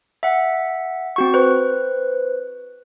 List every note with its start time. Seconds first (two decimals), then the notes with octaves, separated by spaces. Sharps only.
0.23 E5 F#5
1.16 C4 F#4 C#6
1.34 B4 C5